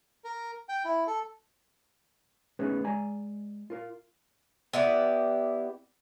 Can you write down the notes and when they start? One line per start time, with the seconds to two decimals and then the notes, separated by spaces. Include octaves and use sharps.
0.24 A#4
0.69 G5
0.85 E4
1.07 A4
2.59 A3 B3 C#4 D#4 G#4 B4
2.84 G#3 D5 G#5 A#5
3.70 F4 A#4 F5
4.73 B3 E4 G4 D5